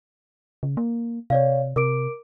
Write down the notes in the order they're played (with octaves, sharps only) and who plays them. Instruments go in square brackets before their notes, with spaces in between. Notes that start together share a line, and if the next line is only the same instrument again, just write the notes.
[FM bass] C#3
A#3
[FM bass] C3 [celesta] C#5 D5 F5
[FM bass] C3 [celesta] A#4 D6 D7